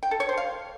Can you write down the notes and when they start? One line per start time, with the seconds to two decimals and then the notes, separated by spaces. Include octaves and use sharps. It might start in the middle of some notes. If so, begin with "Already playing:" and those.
0.03 G5
0.11 A4
0.20 C#5
0.29 C5
0.38 F5